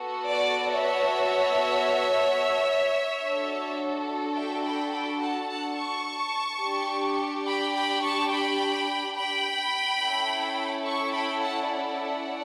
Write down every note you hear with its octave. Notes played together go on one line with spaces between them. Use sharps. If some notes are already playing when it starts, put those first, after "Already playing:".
Already playing: B3 F#4 A4
D5
C#5 E5
D4 F#4 A4
E5 G5
G5 B5
G5 B5
F#5 A5
F#5 A5
A5 C#6
D4 G4
G5 B5
G5 B5
A5 C#6
G5 B5
G5 B5
C#4 E4 A4
A5 C#6
G5 B5
F#5 A5
D5 F#5